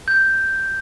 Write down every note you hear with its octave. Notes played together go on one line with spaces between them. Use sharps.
G6